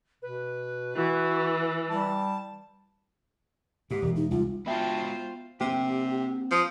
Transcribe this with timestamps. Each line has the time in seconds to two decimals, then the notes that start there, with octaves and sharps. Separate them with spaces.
0.22 B2 B4
0.96 E3 F#4
1.89 G3 A5
3.91 G#2 G4
4.02 E1
4.16 D#4
4.31 C2 F4
4.66 G#3 B3 F4 F#4 C5 E5 G5 A5
5.61 C3 A#3 C4 G4
6.51 F3 D#6